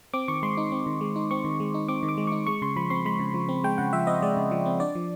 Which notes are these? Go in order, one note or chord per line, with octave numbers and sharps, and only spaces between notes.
C4 D6
D#3 C#6
G#3 C6
D#4
C4
D#3
G#3
D#4
C4 C#6
D#3
G#3
D#4
C4 D6
D#3
D6
G#3
D#4 C#6
G#3 C#6
C#3 C6
F3 B5
C4 C6
G#3 B5
C#3
F3
C4
G#3 G5
C#3 F#5
F3 E5
C4 D#5
G#3 D5
C#3
F3
C4
D4 D5
F3